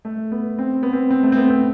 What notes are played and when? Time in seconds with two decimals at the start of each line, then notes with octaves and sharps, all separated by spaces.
0.05 A3
0.32 B3
0.59 C4
0.83 B3
0.93 C4
1.10 C4
1.23 A3
1.32 C4
1.37 B3
1.50 C4